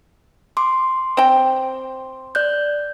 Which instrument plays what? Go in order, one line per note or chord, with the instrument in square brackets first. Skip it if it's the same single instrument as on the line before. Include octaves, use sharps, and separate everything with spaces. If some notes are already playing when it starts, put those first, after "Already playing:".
[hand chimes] C6 D6
[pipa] C4 G5
[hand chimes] D5 F#6 G6